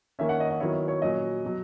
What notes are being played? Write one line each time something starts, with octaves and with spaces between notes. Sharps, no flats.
D#3 A#3 C#4 E5
F#5
D#5
D#5
D#3 F#3 B3 E4 C#5
C#5
A#2 F#3 C#4 D#5
B2 F#3